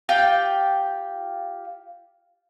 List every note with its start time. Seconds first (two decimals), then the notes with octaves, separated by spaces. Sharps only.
0.09 F4 G4 G5